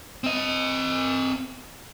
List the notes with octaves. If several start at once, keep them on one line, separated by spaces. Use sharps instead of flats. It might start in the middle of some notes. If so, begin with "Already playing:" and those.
C4 D#5